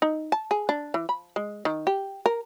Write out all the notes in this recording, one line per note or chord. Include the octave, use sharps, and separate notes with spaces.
D#4
A5
G#4
D4
E3
B5
G#3
D#3
G4
A#4